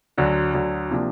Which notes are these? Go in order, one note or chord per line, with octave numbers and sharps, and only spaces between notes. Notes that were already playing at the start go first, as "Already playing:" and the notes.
D2 D3 F#3
D2 D3 F#3
C3 F3 A#3 D4